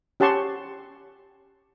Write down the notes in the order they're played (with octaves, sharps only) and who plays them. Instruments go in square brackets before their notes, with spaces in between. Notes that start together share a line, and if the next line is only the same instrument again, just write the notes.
[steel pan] C#4 G4 F#5 A5 C6 C#6